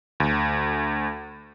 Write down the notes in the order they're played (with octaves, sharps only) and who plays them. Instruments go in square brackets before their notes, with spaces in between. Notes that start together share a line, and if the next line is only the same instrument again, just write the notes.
[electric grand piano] D2